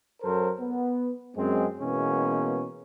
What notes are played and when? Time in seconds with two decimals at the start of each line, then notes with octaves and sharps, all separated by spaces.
0.23 F#2 F#3 A4 A#4 C5
0.60 B3
1.36 F#2 G#3 C4
1.79 B2 E3 G#3 A#3 B3 C#4